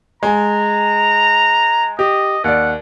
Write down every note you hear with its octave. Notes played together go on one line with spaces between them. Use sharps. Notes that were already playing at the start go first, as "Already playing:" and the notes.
G#3 G#5 A#5
G4 D#5
D#2 D5 F#5